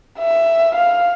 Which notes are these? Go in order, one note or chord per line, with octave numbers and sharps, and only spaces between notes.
E5
F5